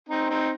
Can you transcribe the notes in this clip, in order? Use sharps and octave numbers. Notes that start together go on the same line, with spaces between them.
C4 D#4
C4 D#4